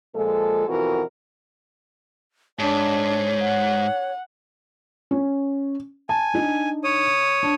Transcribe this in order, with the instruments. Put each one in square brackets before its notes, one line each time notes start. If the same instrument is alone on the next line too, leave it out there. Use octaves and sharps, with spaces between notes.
[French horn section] A#2 F3 G#3 A4
F2 B2 E3 F#4 A#4
[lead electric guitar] G#2 [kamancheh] D4 [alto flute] C#5
[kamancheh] F#5
[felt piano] C#4
[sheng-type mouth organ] G#5 [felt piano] A5
[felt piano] D4 D#4
[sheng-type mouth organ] C#5 D#6
[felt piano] D4